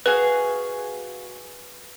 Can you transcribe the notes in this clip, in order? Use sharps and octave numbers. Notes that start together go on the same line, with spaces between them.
F#4 G#4 B4 F5